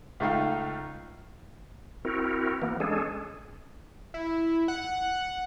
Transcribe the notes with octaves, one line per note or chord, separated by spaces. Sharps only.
C#2 A3 D#4 F5 G5
C4 E4 F#4 A#4
E3 A#3 B3
G#3 C#4 D4 G#4 A4
E4
F#5